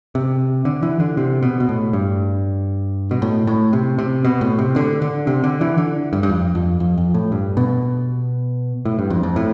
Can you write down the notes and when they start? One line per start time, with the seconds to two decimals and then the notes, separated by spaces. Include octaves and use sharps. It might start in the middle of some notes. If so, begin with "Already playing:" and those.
0.15 C3
0.65 D3
0.83 E3
1.00 D3
1.17 C3
1.42 B2
1.60 B2
1.69 A2
1.93 G2
3.11 B2
3.22 A2
3.47 A2
3.73 C3
3.98 C3
4.24 B2
4.41 A2
4.59 C3
4.76 D3
5.02 D3
5.27 C3
5.44 D3
5.61 E3
5.78 D3
6.13 G2
6.23 G2
6.30 F2
6.55 F2
6.80 F2
6.98 F2
7.14 A2
7.32 G2
7.57 B2
8.85 A2
8.99 G2
9.10 F2
9.23 F2
9.36 A2